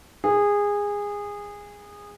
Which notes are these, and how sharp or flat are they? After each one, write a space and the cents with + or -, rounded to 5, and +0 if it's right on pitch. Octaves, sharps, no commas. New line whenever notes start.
G#4 -20